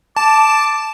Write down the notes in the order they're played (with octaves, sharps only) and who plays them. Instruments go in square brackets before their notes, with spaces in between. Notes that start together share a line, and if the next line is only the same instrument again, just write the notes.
[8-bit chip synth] A5 [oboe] D6